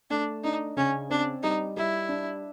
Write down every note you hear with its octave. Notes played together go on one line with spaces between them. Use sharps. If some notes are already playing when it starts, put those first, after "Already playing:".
A3 D4
D4 D#4
C#3 C#4
C4 D4
G3 D#4
G3 E4
D4